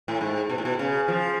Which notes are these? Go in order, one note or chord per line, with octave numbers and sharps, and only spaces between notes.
A2
G#2
B2
A2
B2
C#3
F3